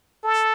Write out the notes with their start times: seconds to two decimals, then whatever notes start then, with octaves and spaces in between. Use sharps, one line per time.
0.23 A4